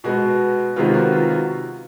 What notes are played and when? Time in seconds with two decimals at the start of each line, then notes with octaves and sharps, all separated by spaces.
0.04 B2 G#3 B3 F#4
0.76 C3 D#3 G#3 B3 F4
0.94 F#4
1.12 F4
1.30 F#4